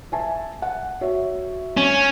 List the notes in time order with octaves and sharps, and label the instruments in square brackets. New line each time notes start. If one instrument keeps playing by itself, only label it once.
[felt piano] E5 G#5 A5
F#5
F#4 C#5 E5
[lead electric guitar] C#4